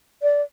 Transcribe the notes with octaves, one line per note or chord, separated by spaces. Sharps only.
D5